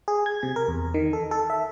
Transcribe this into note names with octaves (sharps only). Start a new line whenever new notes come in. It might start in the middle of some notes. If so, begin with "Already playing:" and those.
G#4
G#6
C3
A#4
E2
D#3
A4
A4
E5